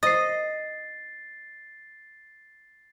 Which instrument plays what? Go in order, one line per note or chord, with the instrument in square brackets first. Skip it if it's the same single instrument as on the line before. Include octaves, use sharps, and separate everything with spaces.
[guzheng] D#5 [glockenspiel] A6 C7